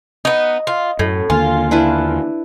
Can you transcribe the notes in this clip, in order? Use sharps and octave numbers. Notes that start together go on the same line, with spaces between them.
B3 D#4 D#5
F4
F#2 A2
D#2 D3 A#3 F4 G#5
D4 E4 B4